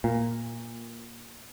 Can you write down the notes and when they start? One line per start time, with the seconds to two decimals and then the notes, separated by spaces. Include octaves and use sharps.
0.04 A#2